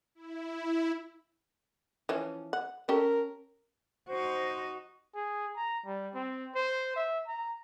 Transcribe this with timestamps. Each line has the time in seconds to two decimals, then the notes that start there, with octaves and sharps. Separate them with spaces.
0.15 E4
2.09 E3 F3 C#4
2.53 F#5
2.89 C#4 G4 A4 A#4
4.09 D#4 F#4 C5
5.15 G#4
5.57 A#5
5.86 G3
6.15 C4
6.55 C5
6.96 E5
7.28 A#5